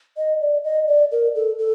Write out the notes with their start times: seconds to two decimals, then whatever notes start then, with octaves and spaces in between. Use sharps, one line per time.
0.17 D#5
0.41 D5
0.64 D#5
0.88 D5
1.12 A#4
1.35 A4
1.59 A4